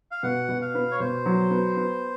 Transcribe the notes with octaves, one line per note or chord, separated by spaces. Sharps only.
F5
B2 F#5
B2
F5
B3
C#5
B2 C5
F#3
B3
B3